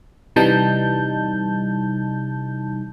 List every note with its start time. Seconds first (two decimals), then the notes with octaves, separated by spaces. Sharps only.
0.36 C3 E3 G3 D#4 A5 G6